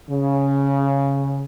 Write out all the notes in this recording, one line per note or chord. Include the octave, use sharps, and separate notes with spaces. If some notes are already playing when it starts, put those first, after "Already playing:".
C#3